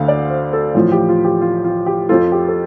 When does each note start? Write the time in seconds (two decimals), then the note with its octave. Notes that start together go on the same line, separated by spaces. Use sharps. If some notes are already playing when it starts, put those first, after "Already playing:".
Already playing: D2 D3 A3 F5
0.08 D5
0.30 C5
0.53 A4
0.74 A1 A2 F3 F4
0.92 G4
1.09 F4
1.25 G4
1.42 F4
1.64 F4
1.86 G4
2.09 F2 F3 C4 F4 A4
2.32 G4
2.48 A4